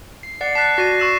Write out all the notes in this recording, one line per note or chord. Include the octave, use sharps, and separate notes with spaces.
C7
D5 F#5 A6 C7
A5 F#6 B6 C7
F#4 D5 A#6 D#7
C#6 E6 E7